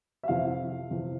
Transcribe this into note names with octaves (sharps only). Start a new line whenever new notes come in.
E5
F2 C3 E3 F5
F2 C3 E3